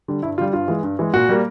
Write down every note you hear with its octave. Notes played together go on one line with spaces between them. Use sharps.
D3 G3
G2 E4
D3 G3 F4
G2 F4
E3 G#3
G2
E3 G#3
A#2 F#4
G3 A#3